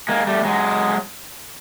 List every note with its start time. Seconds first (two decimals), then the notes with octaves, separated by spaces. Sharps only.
0.09 G#3 A#3
0.27 G3 A3
0.45 F#3 G#3